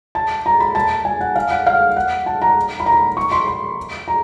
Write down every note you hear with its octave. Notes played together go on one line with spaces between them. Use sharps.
A5
A#5
B5
A5
G#5
F#5
F5
F#5
F5
F#5
A5
A#5
B5
A#5
C#6
C6
B5
A#5